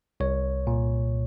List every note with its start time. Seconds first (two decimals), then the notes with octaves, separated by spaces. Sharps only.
0.20 C2 C#5
0.67 A#2